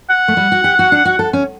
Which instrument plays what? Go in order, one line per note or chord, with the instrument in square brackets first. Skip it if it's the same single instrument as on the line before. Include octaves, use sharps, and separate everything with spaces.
[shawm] F#5
[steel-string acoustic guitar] A3
G3
F#4
G4
F#4
D4
F#4
A4
C#4